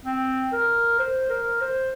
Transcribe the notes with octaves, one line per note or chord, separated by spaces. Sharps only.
C4
A#4
C5
A#4
C5